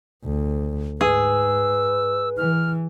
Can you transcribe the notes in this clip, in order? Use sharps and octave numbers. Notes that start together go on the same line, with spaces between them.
D2
G#2 G#4 B4 E6
E3 F6